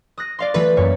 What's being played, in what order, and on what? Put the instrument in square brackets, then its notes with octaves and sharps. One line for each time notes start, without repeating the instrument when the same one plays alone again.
[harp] D#6 F#6 A#6
D5 F5 C6
[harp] E3 A3 F4 [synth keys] B4
[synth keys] F#2 A#2 [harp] C#5